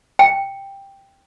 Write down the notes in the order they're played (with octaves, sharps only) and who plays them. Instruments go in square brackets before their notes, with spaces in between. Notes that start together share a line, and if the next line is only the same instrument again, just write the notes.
[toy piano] G5